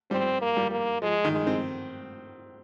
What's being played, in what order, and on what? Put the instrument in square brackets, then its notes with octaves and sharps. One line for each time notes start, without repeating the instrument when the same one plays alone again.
[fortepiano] G3 [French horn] C4
[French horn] A#3
[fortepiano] G3
[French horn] A#3
[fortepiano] F3 [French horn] G#3
[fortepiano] D#3
[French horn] G#3
[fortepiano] C4